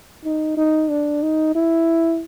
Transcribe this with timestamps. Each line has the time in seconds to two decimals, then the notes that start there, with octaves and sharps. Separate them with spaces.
0.24 D#4
0.57 D#4
0.90 D4
1.23 D#4
1.55 E4